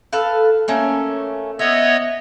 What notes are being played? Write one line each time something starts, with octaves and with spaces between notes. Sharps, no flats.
A4 B4 F5
A3 A#3 C#4
B3 C#5 D#5 E5